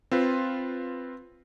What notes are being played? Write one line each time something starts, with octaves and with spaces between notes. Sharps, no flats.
C4 F4 B4